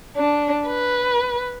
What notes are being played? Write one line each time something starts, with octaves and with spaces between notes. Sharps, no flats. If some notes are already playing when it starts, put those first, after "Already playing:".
D4
B4